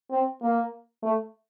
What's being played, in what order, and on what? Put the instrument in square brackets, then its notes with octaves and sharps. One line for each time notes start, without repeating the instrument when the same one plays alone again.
[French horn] C4
A#3
A3